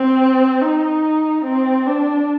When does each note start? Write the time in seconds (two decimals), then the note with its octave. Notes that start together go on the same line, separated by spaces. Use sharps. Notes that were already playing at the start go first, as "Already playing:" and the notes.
Already playing: C4
0.62 D#4
1.44 C4
1.86 D4